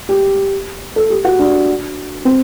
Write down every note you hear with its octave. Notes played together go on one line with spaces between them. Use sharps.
G4
A4
G4
F#4
D4
C4